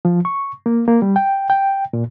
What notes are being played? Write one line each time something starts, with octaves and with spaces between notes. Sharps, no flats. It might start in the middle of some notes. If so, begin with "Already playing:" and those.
F3
C#6
A#3
A#3
G3
G5
G5
A#2